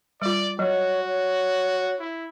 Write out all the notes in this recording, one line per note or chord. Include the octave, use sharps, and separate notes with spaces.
G3 F4 D5
F#3 F#4 C#5
C#5
E4